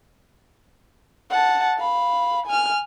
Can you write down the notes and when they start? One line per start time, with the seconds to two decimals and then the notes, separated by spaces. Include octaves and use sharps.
1.30 F#5 A5
1.78 F5 B5
2.46 G#5 F6